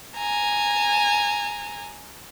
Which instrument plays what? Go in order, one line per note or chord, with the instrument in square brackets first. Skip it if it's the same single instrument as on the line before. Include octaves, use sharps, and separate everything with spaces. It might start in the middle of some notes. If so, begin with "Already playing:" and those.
[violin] G#5 A#5